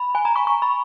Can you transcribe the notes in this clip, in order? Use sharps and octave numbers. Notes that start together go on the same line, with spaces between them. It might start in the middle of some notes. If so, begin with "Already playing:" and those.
Already playing: B5
G#5
A#5
C#6
C#6
B5